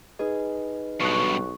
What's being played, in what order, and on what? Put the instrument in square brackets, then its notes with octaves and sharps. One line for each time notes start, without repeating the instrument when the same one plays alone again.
[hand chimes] D#4 B4 D#5 [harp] G#4
[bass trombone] B1 [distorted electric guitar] G2 B2 [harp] C#6 D#6 F#6